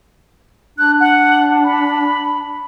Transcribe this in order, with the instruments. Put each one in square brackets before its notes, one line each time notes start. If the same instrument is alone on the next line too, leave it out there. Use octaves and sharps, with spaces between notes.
[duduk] D4 [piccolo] F#6
[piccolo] F#5
B5